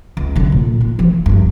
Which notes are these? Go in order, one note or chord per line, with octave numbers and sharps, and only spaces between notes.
C#2
D3 F#3
A#2
D#4
E3 F3
G2